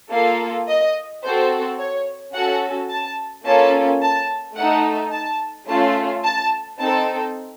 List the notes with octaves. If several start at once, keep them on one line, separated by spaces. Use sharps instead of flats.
A#3 F4 A4 F5
D#5
C4 F#4 A4 C5
C#5
C#4 F#4 A4 F#5
A5
A#3 C#4 F4 A4 A5
A5
A3 D#4 A4 F#5
A5
A3 C#4 F4 A4 A5
A5
C4 D#4 A4 A5